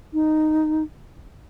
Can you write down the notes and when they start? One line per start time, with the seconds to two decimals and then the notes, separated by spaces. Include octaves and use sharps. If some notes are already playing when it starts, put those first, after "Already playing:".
0.13 D#4